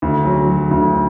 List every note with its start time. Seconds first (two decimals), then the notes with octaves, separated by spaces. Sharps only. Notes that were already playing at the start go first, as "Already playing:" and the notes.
0.02 D2
0.25 F#3
0.48 F#3
0.71 D2